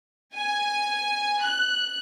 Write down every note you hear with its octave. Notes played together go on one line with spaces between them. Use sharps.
G#5
F#6